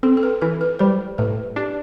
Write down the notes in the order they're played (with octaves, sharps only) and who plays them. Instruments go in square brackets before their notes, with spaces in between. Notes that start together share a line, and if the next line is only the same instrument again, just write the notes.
[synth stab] C4 [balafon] A4
[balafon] A4
B4
[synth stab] E3 [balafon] B4
[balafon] B4
[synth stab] G3 [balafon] C5
[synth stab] A2 [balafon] B4
[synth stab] D4 [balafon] G4